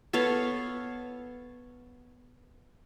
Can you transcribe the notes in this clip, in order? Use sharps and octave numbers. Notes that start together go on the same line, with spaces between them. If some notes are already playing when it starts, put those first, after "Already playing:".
B3 A4 C#5 F5